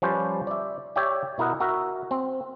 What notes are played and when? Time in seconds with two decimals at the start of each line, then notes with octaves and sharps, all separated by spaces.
0.02 F3 G3 C#4 B4 C5 D5
0.47 D5 E5
0.96 G4 C#5 D5 E5 G5
1.38 B2 E4 A#4 D#5 F#5
1.60 F#4 A#4 E5
2.11 C4